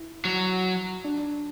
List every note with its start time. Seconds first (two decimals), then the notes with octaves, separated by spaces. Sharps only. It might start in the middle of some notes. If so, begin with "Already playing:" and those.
Already playing: E4
0.25 F#3
1.04 D4